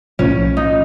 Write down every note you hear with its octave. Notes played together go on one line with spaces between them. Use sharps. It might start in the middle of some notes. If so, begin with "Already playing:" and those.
B1 A2 F3 C#4
D#4